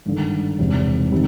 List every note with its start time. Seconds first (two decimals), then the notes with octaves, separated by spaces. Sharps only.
0.06 G#1 G2 D3
0.59 E1 E2 C3
1.12 C3 D#3 G3